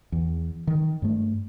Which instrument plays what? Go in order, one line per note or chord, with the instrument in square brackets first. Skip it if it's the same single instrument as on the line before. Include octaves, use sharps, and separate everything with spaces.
[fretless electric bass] E2
D#3
G2 A3